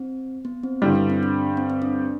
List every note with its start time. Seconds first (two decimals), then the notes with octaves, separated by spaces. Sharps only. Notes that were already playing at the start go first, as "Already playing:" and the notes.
Already playing: C4
0.45 B3
0.63 C4
0.82 G2 D3 G3 E4
0.95 D4
1.10 C4
1.23 D4
1.57 C4
1.70 C4
1.82 D4